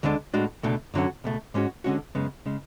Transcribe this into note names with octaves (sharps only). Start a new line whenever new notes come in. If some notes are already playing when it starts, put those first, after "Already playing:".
D2 D3 G#3 D4
A2 G#3 D4 F#4
C#2 B2 A3 D4
F#2 D3 F#3 C#4 F#4
C#2 B2 A3
G#2 G#3 C#4 F#4
D3 G#3 C#4 F#4
F#2 C#3 G#3 B3
C#3 G#3